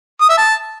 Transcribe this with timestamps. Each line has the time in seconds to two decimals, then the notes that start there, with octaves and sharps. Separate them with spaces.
0.21 D#6
0.30 E5
0.38 A5